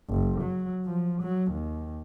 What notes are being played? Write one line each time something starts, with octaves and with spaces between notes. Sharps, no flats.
F#1
F#3
F3
F#3
D#2